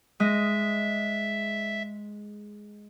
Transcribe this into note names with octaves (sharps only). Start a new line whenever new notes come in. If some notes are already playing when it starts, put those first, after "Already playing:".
G#3 D#5 E5